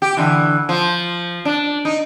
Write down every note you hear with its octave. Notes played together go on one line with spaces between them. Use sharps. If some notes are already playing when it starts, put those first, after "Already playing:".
G4
D3 E3
F3
D4
D#4